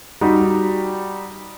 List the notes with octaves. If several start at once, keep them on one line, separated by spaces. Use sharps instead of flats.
G3 D#4 F#4 G4